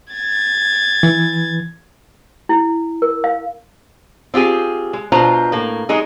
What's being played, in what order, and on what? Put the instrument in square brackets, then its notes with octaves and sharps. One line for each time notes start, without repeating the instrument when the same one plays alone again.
[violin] G#6 A6
[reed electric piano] E3
[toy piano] E4
A#4
F5
[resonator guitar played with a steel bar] C4 F4 G4 G#4
G#3
B2 D4 F4 C5 A#5
A2 A#3
F#3 G#3 D#4 G#4